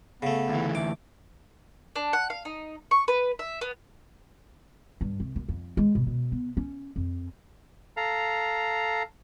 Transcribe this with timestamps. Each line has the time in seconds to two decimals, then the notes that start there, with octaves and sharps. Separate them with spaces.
0.22 C#3 A3 B3
0.50 D2 E3
0.75 A3 D6
1.96 D4
2.13 F#5
2.30 F5
2.45 D#4
2.91 C#6
3.08 B4
3.39 E5
3.61 B3
5.01 G2
5.20 C2
5.36 F#2
5.48 F2
5.77 G#3
5.95 B2
6.06 B2
6.32 B3
6.57 C#4
6.96 F2
7.97 A4 F5 A#5